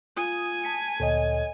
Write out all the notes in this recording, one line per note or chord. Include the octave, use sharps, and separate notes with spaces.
F4 G#5 D#6
A5 B6 C#7
D2 A#2 A4 C#5 D#5